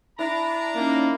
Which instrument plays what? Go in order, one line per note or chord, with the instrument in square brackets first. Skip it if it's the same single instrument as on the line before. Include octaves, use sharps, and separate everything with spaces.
[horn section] D4 A#5 [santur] E4
[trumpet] A#3 [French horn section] C#4 D#4